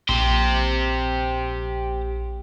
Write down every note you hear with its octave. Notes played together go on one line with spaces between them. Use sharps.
A#1 G4 C5